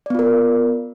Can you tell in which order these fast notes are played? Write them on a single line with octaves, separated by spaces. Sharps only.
D5 B3 F4 A#4